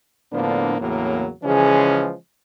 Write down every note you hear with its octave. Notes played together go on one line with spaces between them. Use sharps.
A2 D3 F3 A#3 B3 D4
E2 A2 C#3 F#3 A#3
C#3 E3 F3 G#3 C#4 G#4